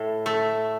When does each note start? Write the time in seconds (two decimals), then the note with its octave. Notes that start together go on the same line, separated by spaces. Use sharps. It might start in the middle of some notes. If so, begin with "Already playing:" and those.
Already playing: A2 A3
0.26 A3